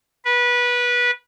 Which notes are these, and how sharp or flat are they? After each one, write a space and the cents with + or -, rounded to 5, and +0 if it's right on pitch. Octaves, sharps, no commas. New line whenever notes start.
B4 -20